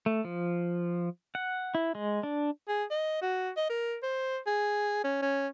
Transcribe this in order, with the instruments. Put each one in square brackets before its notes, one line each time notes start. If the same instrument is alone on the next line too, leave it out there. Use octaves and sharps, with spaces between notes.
[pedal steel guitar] A3
F3
F#5
E4
G#3
D4
[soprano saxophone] G#4
D#5
F#4
D#5
A#4
C5
G#4
C#4
C#4